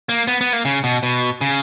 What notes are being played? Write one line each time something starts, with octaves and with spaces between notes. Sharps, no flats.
A#3
B3
B3
A#3
C#3
B2
B2
C#3